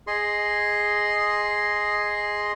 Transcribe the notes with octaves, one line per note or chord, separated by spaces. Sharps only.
G#4 D#5 C6